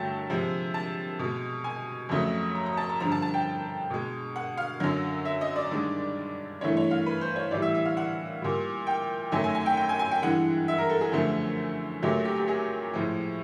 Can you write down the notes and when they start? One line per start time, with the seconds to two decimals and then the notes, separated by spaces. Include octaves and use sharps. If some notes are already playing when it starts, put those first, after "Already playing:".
Already playing: G2 D3 F#3 A3 G5 A5
0.30 C3 F3 G#3
0.74 A5
1.19 B2 G#3
1.64 G#5
2.09 F2 C#3 F#3 A3
2.55 A#5
2.66 A#5
2.77 A5
2.89 A#5
3.00 G2 D3 F3 A#5
3.12 A5
3.22 A5
3.34 G5
3.90 B2 G#3
4.36 F#5
4.57 F5
4.80 F#2 D3 F#3
5.25 E5
5.41 D#5
5.56 D5
5.71 G2 D#3 G#3
6.61 G2 E3 A3 C#5
6.77 C#5
6.91 F5
7.06 B4
7.21 C5
7.36 C#5
7.51 A2 E3 G3 D5
7.62 E5
7.74 E5
7.85 F5
7.97 F#5
8.42 A#2 G3
8.87 G5
9.32 F#2 D#3 F#3 A3 G#5
9.44 G#5
9.55 G#5
9.66 G5
9.77 G5
9.89 G#5
9.99 G#5
10.11 G5
10.22 G2 E3 G#3 F#5
10.68 E5
10.78 A#4
10.89 A4
11.01 G#4
11.12 F#2 D3 F3 A3
12.02 A#2 F#3 A3 G4
12.25 G4
12.36 G4
12.48 G#4
12.93 A2 F3 G#3